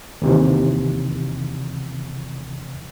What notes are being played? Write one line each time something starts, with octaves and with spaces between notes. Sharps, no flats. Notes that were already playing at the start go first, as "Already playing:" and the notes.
D#2 C3 E3